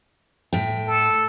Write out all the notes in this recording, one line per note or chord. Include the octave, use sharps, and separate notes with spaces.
A2 G5
A4